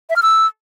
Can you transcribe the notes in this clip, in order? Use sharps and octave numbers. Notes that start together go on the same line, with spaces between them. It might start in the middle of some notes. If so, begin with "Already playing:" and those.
E5
F6
E6